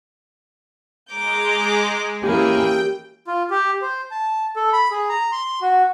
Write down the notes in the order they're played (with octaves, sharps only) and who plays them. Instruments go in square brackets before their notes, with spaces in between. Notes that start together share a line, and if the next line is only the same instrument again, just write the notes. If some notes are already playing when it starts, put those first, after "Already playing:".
[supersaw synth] G#3 [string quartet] A#5 D6 G6
[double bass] E3 A#3 [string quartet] C#4 E4 G#4 [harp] G4 [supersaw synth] G5
[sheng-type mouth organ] F4
G4
C5
A5
A4
B5
G#4
A#5
C6
F#4